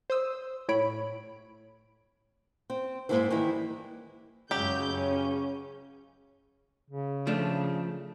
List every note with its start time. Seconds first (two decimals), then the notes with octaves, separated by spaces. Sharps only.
0.10 C5 D#6 E6
0.69 A2 C#5 B5 D7
2.70 C4
3.09 G#2 B2 G#3 A#3 E4 C5
3.30 D#3 E3 G3 A#3 E4
4.51 F#2 C#3 F#3 G#3 G4 G6
4.91 C#4
6.90 C#3
7.27 F3 A3 D4